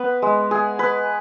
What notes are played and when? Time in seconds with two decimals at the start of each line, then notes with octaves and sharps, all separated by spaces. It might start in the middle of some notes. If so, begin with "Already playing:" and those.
Already playing: B3 B4
0.22 G#3
0.51 G#4
0.79 B4